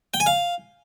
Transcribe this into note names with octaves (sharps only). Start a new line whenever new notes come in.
G5
G#5
F5